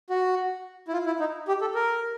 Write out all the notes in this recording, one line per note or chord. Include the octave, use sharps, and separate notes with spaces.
F#4
E4
F4
E4
D#4
G4
A4
A#4